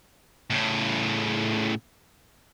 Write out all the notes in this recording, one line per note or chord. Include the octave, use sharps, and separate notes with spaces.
A2 C#3